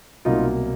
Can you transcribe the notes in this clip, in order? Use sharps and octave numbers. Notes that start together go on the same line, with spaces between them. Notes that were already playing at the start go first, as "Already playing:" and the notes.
C2 B2 F#3 A#3 D#4 F4